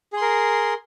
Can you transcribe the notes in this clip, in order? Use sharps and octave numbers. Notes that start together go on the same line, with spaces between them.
G#4 A#4 C6